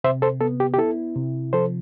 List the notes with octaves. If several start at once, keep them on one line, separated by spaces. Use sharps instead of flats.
C3 C5 E5
A4 C5
B3 A4
G4
G4
E4 A4
C3
F3 A4 C5